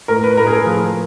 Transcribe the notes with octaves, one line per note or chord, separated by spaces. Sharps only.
A2 A#4
B4
A2 A#4
G#4
A4
F3